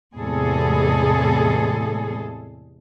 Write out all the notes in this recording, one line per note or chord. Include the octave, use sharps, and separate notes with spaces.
E2 A2 C3 G#3 G#4 A4